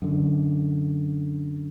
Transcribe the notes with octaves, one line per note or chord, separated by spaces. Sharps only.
F#2 D3